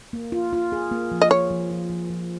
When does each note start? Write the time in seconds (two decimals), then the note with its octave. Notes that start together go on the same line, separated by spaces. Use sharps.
0.13 A#3
0.32 F4
0.53 F4
0.72 G#4
0.91 A#3
1.12 F3
1.22 D#5
1.31 F3 C#5
1.51 F3
1.71 F3
1.90 F3
2.10 F3